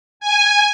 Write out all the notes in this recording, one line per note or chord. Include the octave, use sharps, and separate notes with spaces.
G#5